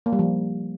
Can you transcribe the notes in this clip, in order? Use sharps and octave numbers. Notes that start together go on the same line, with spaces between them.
A#3
G3
F3